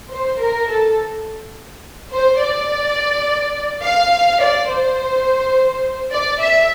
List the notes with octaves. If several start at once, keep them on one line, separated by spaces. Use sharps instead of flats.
C5
A#4
A4
C5
D5
F5
D5
C5
D5
E5